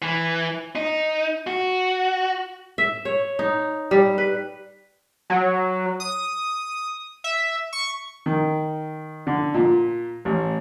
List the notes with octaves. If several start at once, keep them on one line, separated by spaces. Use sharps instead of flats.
E3
D#4
F#4
E5
C#5
D#4
G3
B4
F#3
D#6
E5
C#6
D#3
D3
A#2
A1